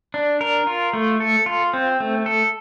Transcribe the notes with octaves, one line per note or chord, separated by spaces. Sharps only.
D4
A#4
F4
A3
A4
F4
C4
A3
A4